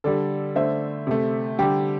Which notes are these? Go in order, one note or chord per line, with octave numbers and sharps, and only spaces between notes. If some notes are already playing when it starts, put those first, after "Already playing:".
D3 G3 A4 D5
D3 A3 C5 E5
C3 A3
D3 G3 G4